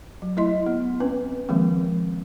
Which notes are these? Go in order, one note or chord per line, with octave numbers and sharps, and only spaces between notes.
F#3
A3 E4 D#5 C6
B3
C4 C#4 B4
D#3 F3 G#3 A#3 C4